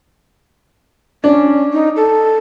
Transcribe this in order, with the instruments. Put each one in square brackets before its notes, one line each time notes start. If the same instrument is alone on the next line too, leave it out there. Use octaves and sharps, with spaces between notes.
[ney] C#4 [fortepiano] D4
[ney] D#4
A4